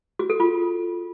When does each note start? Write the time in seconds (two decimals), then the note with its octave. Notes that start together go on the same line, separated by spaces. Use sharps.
0.19 F#4
0.30 A4
0.40 F4